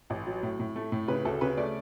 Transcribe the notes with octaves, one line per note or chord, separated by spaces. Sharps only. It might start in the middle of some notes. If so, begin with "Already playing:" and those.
A1
F#3
A2
A2
A3
A2
C#3 B4
D2 A4
C#3 B4
A3 D5